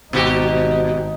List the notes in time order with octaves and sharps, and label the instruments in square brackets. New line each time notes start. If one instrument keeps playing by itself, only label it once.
[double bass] G#1 D#4 [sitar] B2 F#4 G4